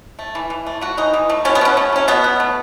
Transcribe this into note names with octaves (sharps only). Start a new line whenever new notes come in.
A3
E3
E3
A3
A3 F#4
E3 D#4
E3
A3
B2 C#4
B3
B2 C#4
A3
F#3 C#4
B2 B3
B2
A3